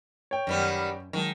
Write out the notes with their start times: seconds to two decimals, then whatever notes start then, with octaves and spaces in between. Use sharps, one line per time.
0.31 C#5 G5
0.47 F#2 D#3 G3 B3
1.13 D#3 F#3 G#3 A5